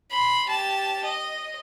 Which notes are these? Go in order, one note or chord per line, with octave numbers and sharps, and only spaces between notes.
B5 C6
G4 A5
D#5